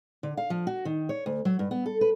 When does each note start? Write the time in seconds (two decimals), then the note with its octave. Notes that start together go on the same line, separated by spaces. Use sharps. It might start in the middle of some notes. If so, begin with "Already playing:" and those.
0.23 D3
0.37 F5
0.50 F3
0.67 F#4
0.85 D#3
1.09 C#5
1.26 D2
1.45 F#3
1.59 G2
1.71 B3
1.86 A4
2.01 B4